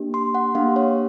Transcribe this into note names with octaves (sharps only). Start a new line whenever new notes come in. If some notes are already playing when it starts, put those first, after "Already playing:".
Already playing: A#3 D4 G4
C6
F#5
A#3 D4 G4 F5
C#5